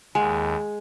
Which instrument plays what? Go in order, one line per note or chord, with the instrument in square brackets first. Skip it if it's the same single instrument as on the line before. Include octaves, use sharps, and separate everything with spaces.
[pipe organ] D#2 [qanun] G#3 [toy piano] F#5 G#5